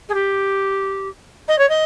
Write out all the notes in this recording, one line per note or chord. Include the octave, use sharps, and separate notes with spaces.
G#4
G4
D#5
C#5
D#5